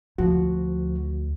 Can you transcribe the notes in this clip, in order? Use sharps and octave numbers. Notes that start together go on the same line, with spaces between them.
D2 F3 F#4